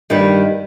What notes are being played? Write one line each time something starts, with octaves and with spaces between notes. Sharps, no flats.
G2 D#3 G3